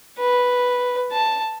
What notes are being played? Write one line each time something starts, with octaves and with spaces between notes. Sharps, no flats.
B4
A5